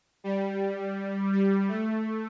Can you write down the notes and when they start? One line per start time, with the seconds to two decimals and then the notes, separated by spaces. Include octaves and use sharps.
0.24 G3
1.33 G3
1.68 A3